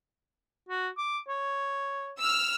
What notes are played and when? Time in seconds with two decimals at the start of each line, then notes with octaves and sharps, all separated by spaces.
0.69 F#4
0.98 D6
1.28 C#5
2.19 E6 F6